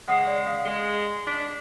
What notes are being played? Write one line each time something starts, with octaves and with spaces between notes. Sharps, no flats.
C#3 G#3 F#5 D#6 C7
D5
F5
G#3 G7
D4 B6